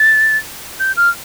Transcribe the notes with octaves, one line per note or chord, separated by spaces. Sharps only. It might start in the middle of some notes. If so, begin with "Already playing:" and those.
Already playing: A6
G6
F6